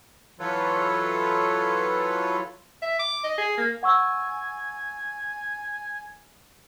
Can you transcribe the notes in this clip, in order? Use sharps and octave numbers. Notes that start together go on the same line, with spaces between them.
E3 F#3 F4 A4 B4 C#5
E5
D6
D#5
G#4
A#3
F#5 G#5 C#6 E6